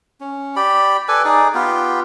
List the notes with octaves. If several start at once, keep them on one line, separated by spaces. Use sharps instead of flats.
C#4
G4 D5 B5
A4 B4 D5 G#5
D#4 G#4 D5
B3 F4 G4